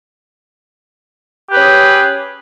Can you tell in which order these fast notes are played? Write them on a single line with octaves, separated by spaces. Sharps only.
G4 B4 C#4 G#4